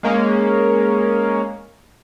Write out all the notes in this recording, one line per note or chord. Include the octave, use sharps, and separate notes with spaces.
G#3 A#3 C#4